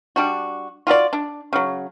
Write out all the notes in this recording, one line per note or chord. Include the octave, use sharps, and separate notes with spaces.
G3 D4 F#4
F4 F#4 A4 D5
D4
C#3 F#3